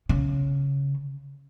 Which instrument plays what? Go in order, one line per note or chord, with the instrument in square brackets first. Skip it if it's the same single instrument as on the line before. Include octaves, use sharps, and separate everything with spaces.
[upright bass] C#3